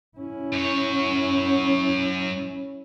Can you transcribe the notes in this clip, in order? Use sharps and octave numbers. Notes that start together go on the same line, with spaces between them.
C#4 E4
F#2 C#5